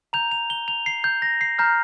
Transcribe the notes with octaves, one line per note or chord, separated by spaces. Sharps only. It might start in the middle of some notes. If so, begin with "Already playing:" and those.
A#5 G6 F7
F7
G7
F7
C7
G6
A#6
C7
A#5 F6 G6